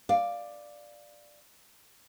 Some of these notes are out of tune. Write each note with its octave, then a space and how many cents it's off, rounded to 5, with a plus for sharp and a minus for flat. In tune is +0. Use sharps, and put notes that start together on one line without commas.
D5 +5 F5 +0